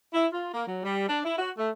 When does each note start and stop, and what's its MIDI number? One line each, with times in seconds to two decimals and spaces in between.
0.13 0.25 64
0.32 0.46 65
0.53 0.65 58
0.65 0.82 54
0.83 1.07 55
1.07 1.19 62
1.23 1.36 64
1.37 1.49 66
1.57 1.69 57